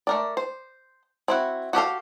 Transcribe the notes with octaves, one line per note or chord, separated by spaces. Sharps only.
A3 A#4 D5
C5
C4 E4 F#4
F#4 G4 A4 F5